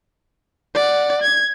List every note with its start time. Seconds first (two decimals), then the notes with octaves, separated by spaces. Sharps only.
0.75 D5 F#5
1.22 G#6